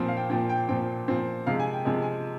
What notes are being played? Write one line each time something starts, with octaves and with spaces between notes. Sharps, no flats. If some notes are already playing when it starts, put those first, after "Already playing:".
Already playing: A#2 F3 C4
F5
G5
A#2 F3 C4 G5
G5
A#2 F3 C4 G5
A#2 F3 C4
C3 F3 G#3 F5
G#5
G5
C3 F3 G#3 G#5
G#5